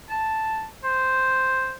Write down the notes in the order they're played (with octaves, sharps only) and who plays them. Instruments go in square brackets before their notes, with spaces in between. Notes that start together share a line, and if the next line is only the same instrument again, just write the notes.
[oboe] A5
C5